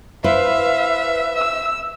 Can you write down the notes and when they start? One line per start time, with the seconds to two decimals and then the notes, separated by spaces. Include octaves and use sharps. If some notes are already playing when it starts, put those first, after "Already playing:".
0.24 E4 B4 C5 E5 F5
1.35 E6